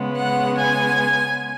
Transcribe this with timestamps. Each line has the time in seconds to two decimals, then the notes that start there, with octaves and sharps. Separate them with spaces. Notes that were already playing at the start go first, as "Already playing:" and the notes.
Already playing: C#3 G#3 B3
0.16 F#5
0.57 G#5